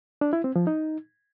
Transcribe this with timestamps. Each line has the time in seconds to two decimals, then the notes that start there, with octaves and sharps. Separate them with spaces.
0.21 D4
0.33 E4
0.44 C4
0.56 F3
0.67 D#4